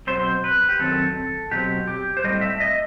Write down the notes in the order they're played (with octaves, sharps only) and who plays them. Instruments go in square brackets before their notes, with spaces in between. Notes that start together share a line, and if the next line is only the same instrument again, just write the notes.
[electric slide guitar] B2 F#3 C4 C5
B4
G4
F#2 D#3 F#3 C4 A4
B2 F#3 C4 G4
G4
C5
A2 G3 C4 D#5
E5
D#5